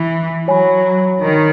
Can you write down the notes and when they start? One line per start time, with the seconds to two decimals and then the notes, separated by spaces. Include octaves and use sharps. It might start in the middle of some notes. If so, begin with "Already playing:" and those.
Already playing: E3
0.48 F#3 C#5 G#5 B5
1.20 D#3